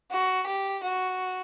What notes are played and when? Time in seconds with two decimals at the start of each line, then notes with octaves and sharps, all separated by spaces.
0.11 F#4
0.47 G4
0.83 F#4